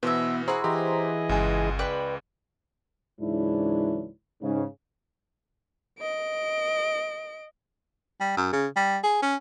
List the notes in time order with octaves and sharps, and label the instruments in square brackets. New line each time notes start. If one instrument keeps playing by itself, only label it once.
[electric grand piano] B2 E3 [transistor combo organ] B3 [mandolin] C5 E5
[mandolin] E4 F#4 [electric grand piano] G#4 [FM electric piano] C5 A#5 C6
[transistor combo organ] E3 G#4 D#5 [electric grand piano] G4
[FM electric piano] G1 G#5 [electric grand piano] C#2 G#3
[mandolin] B4 D5 G5
[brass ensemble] C#2 G#2 E3 F#3 D4 E4
G#2 C#3
[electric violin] D#5 D7
[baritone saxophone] G3
F#2
C#3
G3
G#4
C#4